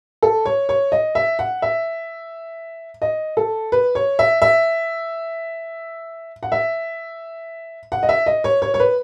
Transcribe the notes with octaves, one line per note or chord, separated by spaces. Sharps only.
A4
C#5
C#5
D#5
E5
F#5
E5
D#5
A4
B4
C#5
E5
E5
F#5
E5
F#5
D#5
E5
D#5
C#5
C#5
C#5
B4